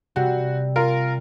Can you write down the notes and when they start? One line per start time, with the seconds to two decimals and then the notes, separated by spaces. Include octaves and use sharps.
0.16 C3 G3 C4 F#4
0.76 F4 A#4